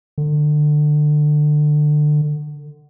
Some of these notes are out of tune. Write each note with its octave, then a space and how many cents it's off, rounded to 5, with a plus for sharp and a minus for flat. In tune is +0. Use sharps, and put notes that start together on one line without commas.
D3 +25